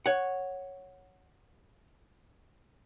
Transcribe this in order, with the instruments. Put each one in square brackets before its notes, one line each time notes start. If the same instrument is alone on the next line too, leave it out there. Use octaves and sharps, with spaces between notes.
[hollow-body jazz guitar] C#5 F#5